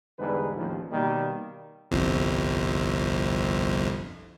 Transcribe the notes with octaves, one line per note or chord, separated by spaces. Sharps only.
E2 G#2 D3 G3 G#4 B4
A1 D#2 A2 F3
B2 D#3 G3 A#3
G1 C2 F2